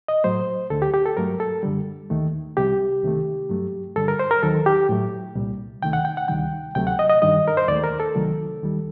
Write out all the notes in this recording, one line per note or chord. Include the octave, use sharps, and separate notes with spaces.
D#5
A2 F#3 A3 C5
D2 D3 A3 A4
G4
G4
A4
G2 F#3 A3 A#4
A4
F#2 D3 G3
D#2 D#3 A3
C2 C3 G3 G4
C2 C3 D#3 A3
G2 F#3 A3
G2 D3 G3 A4
A#4
C5
A#4
D#2 D#3 F#3 A4
G4
A2 F#3 A3
C2 A#2 G3
D2 C3 D#3 A3 G5
F#5
G5
F#5
D2 C3 D#3 G3 G5
D2 C3 F#3 A3 G5
F#5
D#5
D#5
G2 D#3 G3 D#5
A#4
C5
D#2 D#3 A3 D5
A#4
A4
C2 C3 D#3 F#3 A3
D#2 D#3 G3